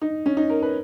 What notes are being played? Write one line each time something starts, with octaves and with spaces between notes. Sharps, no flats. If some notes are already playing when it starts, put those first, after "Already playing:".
D#4
C#4
D#4
A#4
B4